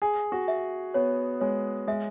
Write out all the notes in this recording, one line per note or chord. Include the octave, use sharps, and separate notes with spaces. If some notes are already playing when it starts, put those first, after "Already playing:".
G#4 G#5
F#4
E5
B3 C#5
G#3 C#5
G#3 E5